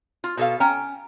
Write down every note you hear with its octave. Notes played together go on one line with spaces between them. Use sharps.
F4
B2 A4 F5
C#4 G5 A#5